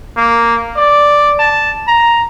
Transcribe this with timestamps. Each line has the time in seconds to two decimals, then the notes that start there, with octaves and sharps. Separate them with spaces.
0.17 A#3
0.76 D5
1.39 A5
1.88 A#5